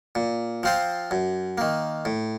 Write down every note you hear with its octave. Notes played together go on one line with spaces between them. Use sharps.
A#2
F3 C4 F4 C5
F#2
D#3 A#3
A2